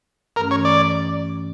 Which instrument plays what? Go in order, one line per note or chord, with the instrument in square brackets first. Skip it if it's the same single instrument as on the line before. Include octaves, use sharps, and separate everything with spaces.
[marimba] G2 E3 A3 C#4 [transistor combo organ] A#4
[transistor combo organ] C#5
D5